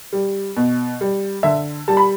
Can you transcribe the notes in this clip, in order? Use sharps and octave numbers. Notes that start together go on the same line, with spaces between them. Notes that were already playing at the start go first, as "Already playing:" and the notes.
G3
B2
G3
D3 E5
G3 A5
B5